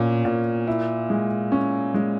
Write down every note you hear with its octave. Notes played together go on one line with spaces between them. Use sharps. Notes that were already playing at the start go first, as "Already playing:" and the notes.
Already playing: A#2 C#4
A#2
E4
G#3
C#4
G#3